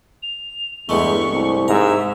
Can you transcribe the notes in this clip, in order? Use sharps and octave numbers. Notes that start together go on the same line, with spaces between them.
F7
E2 G2 G#3 A3 C#6
C2
G#2 E5 A#5